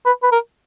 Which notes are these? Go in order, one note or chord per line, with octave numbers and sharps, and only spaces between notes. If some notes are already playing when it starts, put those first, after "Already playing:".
B4
B4
A#4